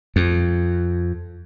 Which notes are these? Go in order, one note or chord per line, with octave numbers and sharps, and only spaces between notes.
F2